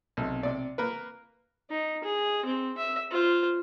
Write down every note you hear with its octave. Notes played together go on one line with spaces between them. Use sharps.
B1 C3
C3 D5
A#3 A#4 B4
D#4
G#4
C4
E5
F4 C5